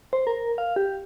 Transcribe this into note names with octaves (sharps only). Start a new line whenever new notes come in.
C5
A#4
F5
G4